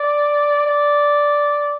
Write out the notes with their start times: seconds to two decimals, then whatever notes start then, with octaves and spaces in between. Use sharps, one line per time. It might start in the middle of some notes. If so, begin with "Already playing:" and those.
Already playing: D5
0.66 D5